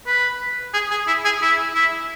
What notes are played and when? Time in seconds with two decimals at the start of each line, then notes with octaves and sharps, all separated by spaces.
0.06 B4
0.74 G#4
0.91 G#4
1.07 E4
1.25 G#4
1.41 E4
1.75 E4